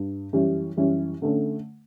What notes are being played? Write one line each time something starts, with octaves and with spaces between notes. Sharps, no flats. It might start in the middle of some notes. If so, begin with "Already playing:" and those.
Already playing: G2
F#2 E3 G3 C#4 G4
F#2 E3 G3 C#4 G4
D3 A3 C#4